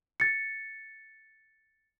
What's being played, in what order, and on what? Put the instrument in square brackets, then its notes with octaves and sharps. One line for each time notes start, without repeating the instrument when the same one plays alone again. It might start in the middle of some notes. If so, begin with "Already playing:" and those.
[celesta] A6 C#7